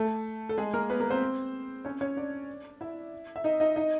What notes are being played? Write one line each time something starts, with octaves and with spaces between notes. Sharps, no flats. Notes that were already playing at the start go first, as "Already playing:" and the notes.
Already playing: A3 A4
A4
G#3 G#4
A#3 A#4
B3 B4
A#3 A#4
C4 C5
C#4 C#5
C#4 C#5
D4 D5
E4 E5
E5
D#4 D#5
D#4 D#5
D#4 D#5